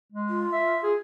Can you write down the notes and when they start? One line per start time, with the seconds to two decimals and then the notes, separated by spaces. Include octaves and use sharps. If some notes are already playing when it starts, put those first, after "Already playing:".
0.12 G#3
0.29 F4
0.53 E5
0.83 G#4